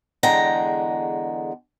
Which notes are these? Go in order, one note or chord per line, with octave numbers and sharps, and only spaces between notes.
E2 D3 G#3 G5 A#5